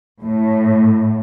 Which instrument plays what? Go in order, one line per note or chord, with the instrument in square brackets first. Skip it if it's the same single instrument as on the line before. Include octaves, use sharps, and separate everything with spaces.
[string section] A2